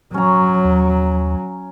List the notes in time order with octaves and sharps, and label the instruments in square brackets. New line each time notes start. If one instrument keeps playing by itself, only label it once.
[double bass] F#3 [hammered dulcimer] C#4 A#5
[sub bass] D#2